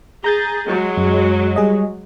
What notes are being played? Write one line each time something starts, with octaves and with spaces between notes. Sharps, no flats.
G#4 A#5 G6 A6
F#3 G#3
F#2
G3 G#4 D#5